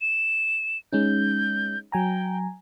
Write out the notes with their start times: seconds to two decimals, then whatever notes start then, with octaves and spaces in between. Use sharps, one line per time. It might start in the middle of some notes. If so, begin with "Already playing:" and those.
0.01 E7
0.93 G#3 C#4 D#4 G6
1.92 F#3 G5 G#5 A#5